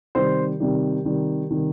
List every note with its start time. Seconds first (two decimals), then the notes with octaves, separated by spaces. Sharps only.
0.15 C3 D#3 G3 C5
0.60 C3 D#3 G3
1.05 C3 D#3 G3
1.50 C3 D#3 G3